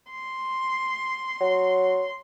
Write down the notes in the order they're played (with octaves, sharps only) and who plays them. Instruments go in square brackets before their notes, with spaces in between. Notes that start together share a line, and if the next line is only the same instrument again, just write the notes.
[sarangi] C6
[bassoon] F#3